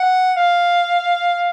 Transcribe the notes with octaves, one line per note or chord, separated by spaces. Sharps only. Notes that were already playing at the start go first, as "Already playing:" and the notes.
Already playing: F#5
F5